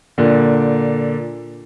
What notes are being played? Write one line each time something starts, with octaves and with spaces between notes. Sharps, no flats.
A#2 D3